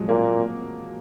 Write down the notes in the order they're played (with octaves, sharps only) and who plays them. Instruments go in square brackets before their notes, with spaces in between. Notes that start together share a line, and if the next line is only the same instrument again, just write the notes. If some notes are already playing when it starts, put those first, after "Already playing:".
Already playing: [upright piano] F3 F#3 G#3
[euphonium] A#2 [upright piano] A#3